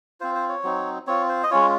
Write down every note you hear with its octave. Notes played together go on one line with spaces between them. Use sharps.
C4 F4 C5
C5
C#5
F#3 C4 D#4
C4 F4 C#5
C5
D#5
G#3 C#4 F4 C#5